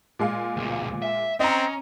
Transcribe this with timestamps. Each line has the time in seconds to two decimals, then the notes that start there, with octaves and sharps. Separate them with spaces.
0.19 A#2 G#3 F5
0.57 D2 B2
1.02 E5
1.40 C4 C#4 D#5 A#5